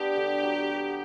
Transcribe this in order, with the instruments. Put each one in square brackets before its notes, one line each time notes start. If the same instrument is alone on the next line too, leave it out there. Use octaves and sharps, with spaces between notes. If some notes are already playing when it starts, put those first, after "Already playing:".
Already playing: [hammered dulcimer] B3 D4 [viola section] G4
[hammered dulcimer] D3
F#3
B3